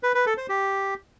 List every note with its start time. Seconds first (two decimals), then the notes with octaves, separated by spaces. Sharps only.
0.03 B4
0.15 B4
0.26 A4
0.38 C5
0.49 G4